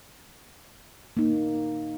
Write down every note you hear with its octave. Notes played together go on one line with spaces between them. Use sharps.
A#3 D#4